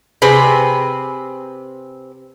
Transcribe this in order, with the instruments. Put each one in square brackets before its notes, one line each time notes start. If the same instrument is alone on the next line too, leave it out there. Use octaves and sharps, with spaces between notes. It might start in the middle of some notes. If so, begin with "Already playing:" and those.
[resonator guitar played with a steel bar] C3 C4 G#4 B4